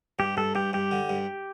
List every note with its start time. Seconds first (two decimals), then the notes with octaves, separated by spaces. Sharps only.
0.19 G2 G4
0.37 G2 A4
0.55 G2 G4
0.73 G2 G4
0.91 D3
1.09 G2